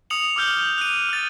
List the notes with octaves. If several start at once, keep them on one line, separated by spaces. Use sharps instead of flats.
D#6 C#7 F7 F#7
D6 E6 F6 G6 G7
F#6 D#7
F6 A6